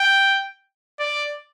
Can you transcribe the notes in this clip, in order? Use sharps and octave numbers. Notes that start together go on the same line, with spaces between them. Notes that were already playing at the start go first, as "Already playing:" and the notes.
Already playing: G5
D5